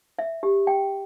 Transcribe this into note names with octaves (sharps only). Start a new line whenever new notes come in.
E5
G4
G5